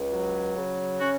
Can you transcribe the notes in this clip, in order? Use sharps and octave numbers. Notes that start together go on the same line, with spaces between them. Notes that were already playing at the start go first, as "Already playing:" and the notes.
Already playing: C#2
F#3
C#3
C#4 F#4